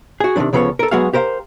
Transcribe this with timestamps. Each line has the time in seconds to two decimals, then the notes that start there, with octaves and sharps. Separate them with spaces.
0.20 F#4 G#4
0.36 C3 D#3 F3 F#3 D4
0.53 C#2 C#3 F3 B3 A4 C#5
0.79 A4 A#4
0.91 F#3 G#3 B3 F#4 G#4 F5
1.13 G4 A#4 C5 F5